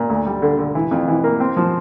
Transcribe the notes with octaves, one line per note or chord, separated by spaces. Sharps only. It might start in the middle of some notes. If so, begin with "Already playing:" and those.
Already playing: A#2
D2
G3
D3
D3
E3
F2
E3
A#3
C4
F3